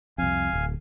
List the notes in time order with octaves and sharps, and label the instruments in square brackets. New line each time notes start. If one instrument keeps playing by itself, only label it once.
[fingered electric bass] C2 F2 [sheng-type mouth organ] F5 G#5
[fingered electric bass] D1